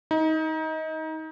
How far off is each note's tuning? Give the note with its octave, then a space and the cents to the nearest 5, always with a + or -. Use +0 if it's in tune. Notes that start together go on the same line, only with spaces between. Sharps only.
D#4 +25